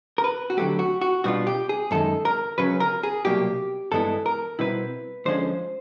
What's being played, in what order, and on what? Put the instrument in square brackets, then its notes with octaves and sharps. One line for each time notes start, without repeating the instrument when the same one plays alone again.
[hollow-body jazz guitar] A#4
B4
F#4
D3 F#3 A3 G4
F#4
F#4
B2 G3 B3 D4 F4 F#4
G4
G#4
F#2 D#3 G#3 A4
A#4
C#2 C#3 F#3 C#4 B4
A#4
G#4
C2 B2 F#3 A#3 G4
G2 E3 G#3 B3 E4 A4
A#4
B2 G3 C4 E4 B4
D2 D3 F3 G#3 C#4 C5